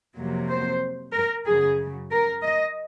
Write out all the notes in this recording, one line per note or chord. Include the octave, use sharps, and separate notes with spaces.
F2 C3 F#3 A#3
C5
A#4
F#2 C#3 F#3 G#4
A#4
D#5